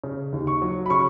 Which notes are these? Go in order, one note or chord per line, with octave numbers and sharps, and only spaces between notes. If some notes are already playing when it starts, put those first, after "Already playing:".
C#3
D#2
C#6
F#3
B5
C#3 C#6